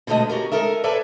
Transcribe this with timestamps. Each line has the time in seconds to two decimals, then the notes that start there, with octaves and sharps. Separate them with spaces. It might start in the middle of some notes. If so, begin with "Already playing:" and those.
0.07 B2 D3 G#3 A3 F#4 D#5
0.29 C#4 F#4 G4 A#4
0.52 G#3 A4 A#4 D#5 E5
0.84 A4 B4 D5 E5 G#5